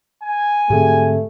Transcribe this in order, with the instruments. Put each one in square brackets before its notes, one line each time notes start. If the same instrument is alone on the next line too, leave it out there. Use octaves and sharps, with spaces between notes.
[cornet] G#5
[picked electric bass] G#2 D3 C4 [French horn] A3 [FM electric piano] G4 G#4